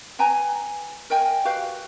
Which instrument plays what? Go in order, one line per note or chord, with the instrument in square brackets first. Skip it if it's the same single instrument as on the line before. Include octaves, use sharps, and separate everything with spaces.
[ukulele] B4 G5 G#5 A#5
A#4 D#5 G5 G#5
F#4 G4 B4 F5